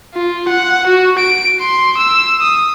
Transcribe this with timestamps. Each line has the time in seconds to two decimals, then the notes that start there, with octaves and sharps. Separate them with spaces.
0.14 F4
0.48 F#5
0.87 F#4
1.18 D7
1.61 C6
1.97 E6
2.41 D#6